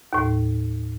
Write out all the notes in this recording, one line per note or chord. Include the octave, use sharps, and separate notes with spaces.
D#2 A2